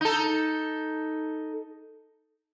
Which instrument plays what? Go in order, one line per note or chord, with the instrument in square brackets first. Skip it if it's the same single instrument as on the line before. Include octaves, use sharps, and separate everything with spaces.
[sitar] D#4 A4